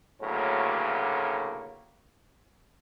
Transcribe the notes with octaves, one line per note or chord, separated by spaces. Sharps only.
D2 A2 C#3 F#3 A#3